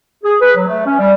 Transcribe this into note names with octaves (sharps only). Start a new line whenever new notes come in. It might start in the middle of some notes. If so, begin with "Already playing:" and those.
G#4
B4
F#3
A3
C#4
G3